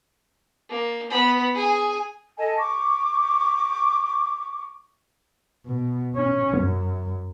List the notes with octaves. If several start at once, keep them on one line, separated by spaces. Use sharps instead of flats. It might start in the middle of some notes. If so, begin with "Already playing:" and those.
A#3
B3 B5
G#4 G#5
A4 D#5 G#5 A5
C#6 D6
B2
C#4
F#2